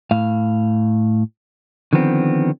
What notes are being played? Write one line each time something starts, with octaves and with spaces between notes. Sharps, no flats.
A2 F5
D3 D#3 F3 B3 C4